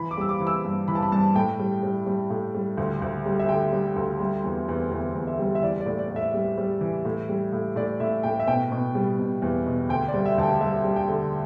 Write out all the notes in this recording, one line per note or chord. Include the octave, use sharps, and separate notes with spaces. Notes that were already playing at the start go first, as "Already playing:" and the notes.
Already playing: E3 B5
D6
G3 E6
D6
E3
E6
G2
E3 B5
A5
B5
G2 A5
A2 G5
G3
G3
G3
A2
G3
D2
D2
G3
E5
D3 G5
G3
D2
G3
E2
E2
E2
E2
E5
G3
E5
E3 D5
D5
A2
D5
A2
E5
G3
G3
E3
A2
G3
A2
A2 D5
A2 E5
A2 G5
E5
B2 G5
B2
G3
B2
E2
B2
D2 G5
D5
G3
E5
D2 A5
G5
G3 E5
G3
G5
D3